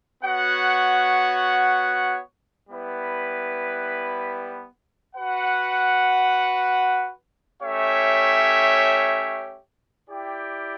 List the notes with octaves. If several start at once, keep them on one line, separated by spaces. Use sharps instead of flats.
B3 F#4 C#5 F#5
G3 B3 E4 B4
F#4 B4 F#5
A3 C#4 G4 C#5 E5
E4 G4 D5 G5